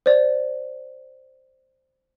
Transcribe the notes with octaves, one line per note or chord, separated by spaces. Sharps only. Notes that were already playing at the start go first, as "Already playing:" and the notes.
C5 D5